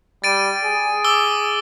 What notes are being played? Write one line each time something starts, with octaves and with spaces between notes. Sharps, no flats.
G3 A6 D7 D#7
G#4
D6 E6 G7